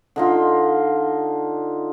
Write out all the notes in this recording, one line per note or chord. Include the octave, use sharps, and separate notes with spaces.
D3 D#4 F4